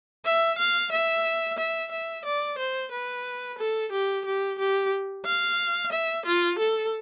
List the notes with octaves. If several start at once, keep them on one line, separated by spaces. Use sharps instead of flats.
E5
F5
E5
E5
E5
D5
C5
B4
A4
G4
G4
G4
F5
E5
F4
A4